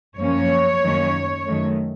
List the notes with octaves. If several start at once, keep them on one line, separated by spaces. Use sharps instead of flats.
F#2 F3 A#3 C#4 C#5
F#2 D#3 A#3 C#4
F#2 D#3 A3